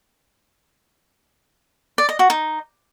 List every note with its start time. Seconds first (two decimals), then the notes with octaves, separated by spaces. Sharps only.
1.98 D5
2.09 D#5
2.19 F#4
2.30 D#4